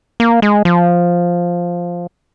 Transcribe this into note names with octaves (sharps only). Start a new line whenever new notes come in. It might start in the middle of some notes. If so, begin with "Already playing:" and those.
A#3
G#3
F3